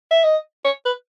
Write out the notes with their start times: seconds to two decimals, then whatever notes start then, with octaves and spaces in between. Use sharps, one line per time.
0.11 E5
0.23 D#5
0.64 C#5
0.85 B4